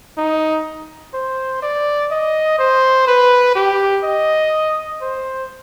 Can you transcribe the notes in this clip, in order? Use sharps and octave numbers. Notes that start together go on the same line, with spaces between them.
D#4
C5
D5
D#5
C5
B4
G4
D#5
C5